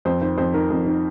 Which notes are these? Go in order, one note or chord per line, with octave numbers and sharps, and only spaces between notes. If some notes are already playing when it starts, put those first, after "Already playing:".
F2 C5
D#3 C5
F2 C5
D#3 A#4
F2
D#3